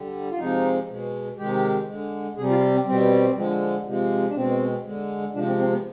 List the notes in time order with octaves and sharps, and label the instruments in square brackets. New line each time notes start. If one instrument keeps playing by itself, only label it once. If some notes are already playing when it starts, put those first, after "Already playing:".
Already playing: [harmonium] D3 G3
F4
C3 F3 G#3 D#4
B2 G#3
C3 D#3 G#3 G4
D3 G#3
C3 G3 G#4
F4
C4
B2 G3 C4
D3 F3 G#3
C3 F3 G#3
D4
B2 G#3 C4
D3 G#3
C3 F3 G#3 D4
C4
C4
B3